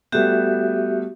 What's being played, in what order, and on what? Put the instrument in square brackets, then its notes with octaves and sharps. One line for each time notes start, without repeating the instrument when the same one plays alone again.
[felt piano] G3 A3 B3 [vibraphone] F#4 G4 E5